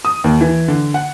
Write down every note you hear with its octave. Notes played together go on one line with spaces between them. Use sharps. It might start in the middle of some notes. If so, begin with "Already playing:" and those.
D#6
D#2
E3
D3
F#5